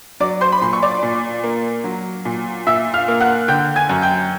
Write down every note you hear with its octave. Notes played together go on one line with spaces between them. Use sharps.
F#3 D5 D6
C5 C6
B5
A#2 C6
C#6
D5 D6
A#2
A#3
F#3
A#2
A#2 E5 E6
F5 F6
A#3
F#5 F#6
D3 G5 G6
G#5 G#6
F#2
G5 G6